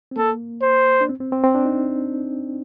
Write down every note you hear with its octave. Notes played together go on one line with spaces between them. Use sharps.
C4
A#3 A4
C5
D4
C4
C4
C4
C4
D4
D#4